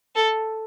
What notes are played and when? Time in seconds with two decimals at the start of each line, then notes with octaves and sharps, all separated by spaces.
0.15 A4